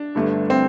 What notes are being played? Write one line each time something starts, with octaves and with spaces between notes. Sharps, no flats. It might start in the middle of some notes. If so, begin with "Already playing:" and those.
Already playing: D4
G1 G2 D3 A3
C4